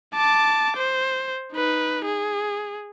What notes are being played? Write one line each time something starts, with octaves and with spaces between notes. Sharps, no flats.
A5 D6
C5
D#4 B4
G#4